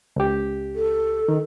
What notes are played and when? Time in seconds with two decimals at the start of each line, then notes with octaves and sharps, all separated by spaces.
0.16 C#2 G4
0.75 A4
1.28 D#3